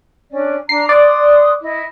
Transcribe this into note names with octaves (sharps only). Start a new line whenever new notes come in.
C#4 D4 D5
D4 A#5 C7
D5 C6 D#6 F#6
E4 D#5